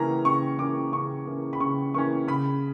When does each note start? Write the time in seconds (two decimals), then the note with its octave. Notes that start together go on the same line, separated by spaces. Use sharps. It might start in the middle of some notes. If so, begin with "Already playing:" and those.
Already playing: C#3 E3 A#3 C#4 A#5
0.25 C#3 C#6
0.58 E3 A#3 C#4 D6
0.92 C#3 C#6
1.26 E3 A#3 C#4
1.53 B5
1.60 C#3 C#6
1.94 E3 A#3 C#4 C#6
2.27 C#3 B5